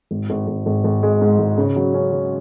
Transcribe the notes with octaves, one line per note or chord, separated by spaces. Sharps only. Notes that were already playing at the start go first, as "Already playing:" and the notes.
G#1
G#1
G#1
G#1
G#1
G#3
G#2
G#1
C#3
F#3
C#4
F#3